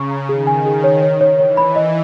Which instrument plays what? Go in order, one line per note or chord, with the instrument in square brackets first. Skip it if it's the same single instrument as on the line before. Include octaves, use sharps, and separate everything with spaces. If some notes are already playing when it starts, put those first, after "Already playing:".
Already playing: [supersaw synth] C#3 [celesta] A#5 C#6
[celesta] A#5
[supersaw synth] D#3 [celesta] G#4
[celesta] G#5
[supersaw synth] D#3 [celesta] G#4
[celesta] C#5
C#5
C#5
[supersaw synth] E3 [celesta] C#5
[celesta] B5
D#5